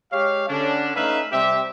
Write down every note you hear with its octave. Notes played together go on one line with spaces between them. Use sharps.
G#3 G4 C#5 F5
D3 C#4 D4
A3 C#4 D#4 B4 E5 F5
C3 G3 C4 G4 E5